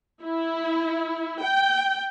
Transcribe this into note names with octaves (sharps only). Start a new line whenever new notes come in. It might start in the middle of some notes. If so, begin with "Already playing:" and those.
E4
G5